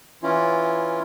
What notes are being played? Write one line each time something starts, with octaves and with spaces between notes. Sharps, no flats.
E3 C#4 E4 F4